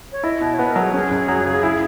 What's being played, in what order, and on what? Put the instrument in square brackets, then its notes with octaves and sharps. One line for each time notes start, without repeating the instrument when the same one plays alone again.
[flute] C#5
[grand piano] E4 [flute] D#5
[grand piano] B2
[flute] C#5
[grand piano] B3 [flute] B4
[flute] A#4
[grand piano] F#3
[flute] G#4
[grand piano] C#4 [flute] G#4
[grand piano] F#2
F#3
C#3
E4